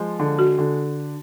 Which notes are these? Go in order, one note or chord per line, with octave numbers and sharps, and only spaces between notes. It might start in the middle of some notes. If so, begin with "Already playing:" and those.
Already playing: F3 G#3
D3
F#4
D3